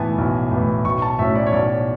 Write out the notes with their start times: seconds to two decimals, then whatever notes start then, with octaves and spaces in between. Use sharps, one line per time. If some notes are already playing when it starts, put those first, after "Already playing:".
Already playing: B1 A2 E3 B3 G#5 A5
0.18 B1
0.51 A2 E3 B3
0.85 B1 C#6
1.02 A5
1.19 A2 F#3 C#4 E5
1.36 D5
1.47 C#5
1.53 B1 D5